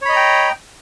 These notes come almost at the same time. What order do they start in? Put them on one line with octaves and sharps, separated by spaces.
C#5 B5 D#5 A#5 G5